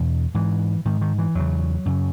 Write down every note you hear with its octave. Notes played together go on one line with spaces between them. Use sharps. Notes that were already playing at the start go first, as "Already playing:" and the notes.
Already playing: E2 B2
G#2 E3
G#2 D#3
D#3
E3
E2 C#3 F#3
F#2 C#3